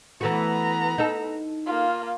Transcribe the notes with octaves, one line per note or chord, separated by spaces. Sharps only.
E3 A3 B3 F#4 A#5
D#4 A4
A#3 F4